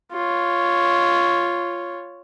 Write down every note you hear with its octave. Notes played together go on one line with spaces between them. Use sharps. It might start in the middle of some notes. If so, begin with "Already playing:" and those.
F4 C#5